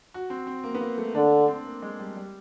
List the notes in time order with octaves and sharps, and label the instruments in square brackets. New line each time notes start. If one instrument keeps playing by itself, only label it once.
[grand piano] F#4
C4
C4
A#3
B3
A#3
A3
[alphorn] D3 [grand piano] D4
[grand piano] C4
A#3
G#3
G3
G3